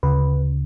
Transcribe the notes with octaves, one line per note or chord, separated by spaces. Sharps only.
D2 C#3 B4